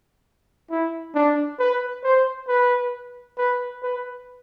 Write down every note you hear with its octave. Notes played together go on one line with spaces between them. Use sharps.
E4
D4
B4
C5
B4
B4
B4